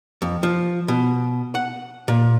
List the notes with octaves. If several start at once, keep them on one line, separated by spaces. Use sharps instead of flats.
F2
F3
B2
F#5
A#2